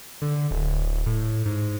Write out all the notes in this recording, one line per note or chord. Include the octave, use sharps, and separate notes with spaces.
D3
D1
A2
G#2